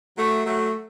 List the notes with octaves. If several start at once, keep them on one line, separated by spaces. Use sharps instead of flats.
F#3 A3
F#3 A3